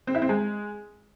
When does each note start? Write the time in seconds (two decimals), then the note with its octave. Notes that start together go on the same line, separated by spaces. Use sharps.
0.07 C4
0.15 E4
0.22 C4
0.29 G#3